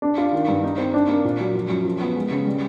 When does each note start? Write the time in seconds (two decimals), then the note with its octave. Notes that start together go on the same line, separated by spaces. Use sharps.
0.02 D4
0.18 F4
0.33 D#3
0.48 G2
0.64 D#4
0.78 C4
0.94 D4
1.09 A#3
1.24 A#2
1.40 F#3
1.54 F3
1.70 F#2
1.85 F3
2.00 B3
2.16 G#3
2.31 C#3
2.46 G3